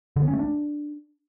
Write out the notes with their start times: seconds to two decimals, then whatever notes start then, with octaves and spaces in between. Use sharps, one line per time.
0.16 D3
0.22 B3
0.28 C#4
0.33 A3
0.39 D4